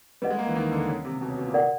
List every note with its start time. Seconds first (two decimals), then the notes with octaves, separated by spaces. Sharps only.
0.22 G3 B4 D#5 F#5
0.30 G#3
0.39 A#3
0.47 E3
0.55 D#3
0.72 D3
0.88 C#3
1.05 C3
1.21 B2
1.29 C#3
1.37 B2
1.46 A#2
1.54 A#4 D5 F#5